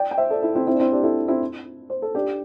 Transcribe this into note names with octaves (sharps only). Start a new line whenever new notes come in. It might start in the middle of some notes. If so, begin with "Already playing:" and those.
Already playing: D5 G5
G5
C5 E5
A4 D5
E4 A4
C4 E4
C4 E4
D4
C4 E4
D4 G4
E4 A4
C4 E4
C5
A4
D4 G4